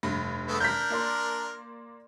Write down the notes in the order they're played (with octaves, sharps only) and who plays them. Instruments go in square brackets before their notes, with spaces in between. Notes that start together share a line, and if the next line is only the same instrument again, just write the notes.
[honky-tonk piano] F1 G2 A#6
[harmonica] G#3 A3 B3
[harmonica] D4 A#4 [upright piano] G6 B6
[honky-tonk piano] A#3 D5 C6